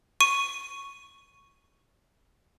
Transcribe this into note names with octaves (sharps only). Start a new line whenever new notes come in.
C#6 D#7